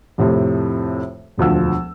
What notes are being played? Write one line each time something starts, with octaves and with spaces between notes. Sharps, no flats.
F2 A2 C3
E1 D2 F3 E6